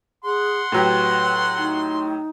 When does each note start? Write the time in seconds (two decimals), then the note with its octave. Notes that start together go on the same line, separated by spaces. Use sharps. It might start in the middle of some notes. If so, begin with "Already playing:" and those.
0.24 G#4 F#5 C6
0.72 A2 F#3 G4 B4
1.57 D#4